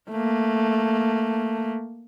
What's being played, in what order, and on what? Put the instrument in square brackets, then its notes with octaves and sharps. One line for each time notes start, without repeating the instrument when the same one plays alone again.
[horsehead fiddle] A3 A#3